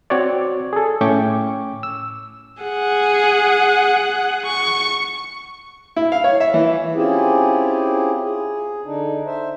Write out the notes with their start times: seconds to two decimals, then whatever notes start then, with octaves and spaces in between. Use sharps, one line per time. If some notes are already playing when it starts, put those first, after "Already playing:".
0.10 C4 F#4 C#5 D5
0.73 G#4 A4
1.01 A2 A3 C#4 G5 C#6 D6
1.83 E6
2.63 G#4 F#5
4.47 C#6
5.96 E4
6.12 F5
6.24 C#5
6.40 E5
6.54 E3
6.95 C4 C#4 E4 F4 G4 G#4
8.21 G#4
8.85 D3 D4 D#4
9.26 C5 E5